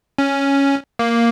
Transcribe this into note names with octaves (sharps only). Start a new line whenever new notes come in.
C#4
A#3